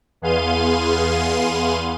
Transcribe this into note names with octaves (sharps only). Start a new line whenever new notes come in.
E2 B3 G#4 F5 C6 D#7